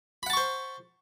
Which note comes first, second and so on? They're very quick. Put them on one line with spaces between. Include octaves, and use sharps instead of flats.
B5 F#5 A5 C#6 C5